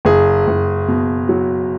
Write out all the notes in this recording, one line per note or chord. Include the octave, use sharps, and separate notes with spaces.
F#1 G#4
F#1
B2
F#3